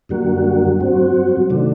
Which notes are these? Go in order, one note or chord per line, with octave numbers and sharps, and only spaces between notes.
F#2 D3 G3 A#3 F#4
G2 F#3 C4 F#4
C3 D#3 A3 D4